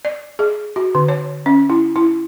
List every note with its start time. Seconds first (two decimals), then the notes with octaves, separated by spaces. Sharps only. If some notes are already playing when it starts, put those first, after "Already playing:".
0.05 D5
0.39 G#4
0.76 F#4
0.95 D3
1.08 C#5
1.46 C#4
1.70 E4
1.96 E4